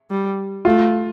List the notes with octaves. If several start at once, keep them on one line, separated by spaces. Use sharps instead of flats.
G3
A3 F4